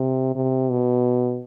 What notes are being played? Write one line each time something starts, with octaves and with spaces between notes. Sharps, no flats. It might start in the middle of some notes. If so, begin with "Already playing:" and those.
Already playing: C3
C3
B2